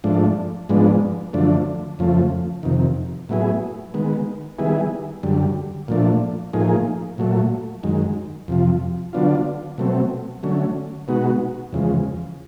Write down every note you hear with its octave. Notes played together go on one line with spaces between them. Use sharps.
G#2 F3 A3 D4
G#2 F3 G#3 B3 D4
F#2 D3 F3 A3 D4
F2 C#3 F3 A3
F2 C3 D#3
A2 F#3 B3 E4 G#4
D#3 G#3 B3
D#3 G3 B3 E4 G#4
F#2 D3 G3
A#2 F3 A3 D4
A2 F3 A#3 D#4 G#4
A#2 F#3 A3
F#2 D#3 G#3
F2 C3 F3
D3 F#3 B3 D4 F4
B2 F#3 A3 C4
D3 F#3 A3 C#4
B2 G#3 B3 D#4 F#4
E2 C#3 F3 G#3